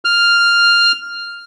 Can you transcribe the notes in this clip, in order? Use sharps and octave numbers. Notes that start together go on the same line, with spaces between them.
F6